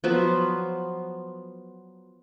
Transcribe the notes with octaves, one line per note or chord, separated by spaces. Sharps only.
F3 F#3 B3